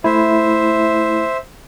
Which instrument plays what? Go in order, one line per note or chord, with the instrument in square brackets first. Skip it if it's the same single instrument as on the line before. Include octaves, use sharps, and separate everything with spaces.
[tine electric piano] A3 E4 [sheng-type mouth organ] C5 E5